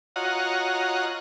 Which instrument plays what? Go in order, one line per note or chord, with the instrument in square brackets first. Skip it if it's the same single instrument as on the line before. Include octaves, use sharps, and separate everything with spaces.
[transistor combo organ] F4 F#4 C#5 D#5 F#5 A#5